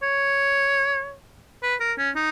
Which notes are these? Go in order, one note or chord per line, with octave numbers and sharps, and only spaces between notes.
C#5
B4
A#4
C#4
D#4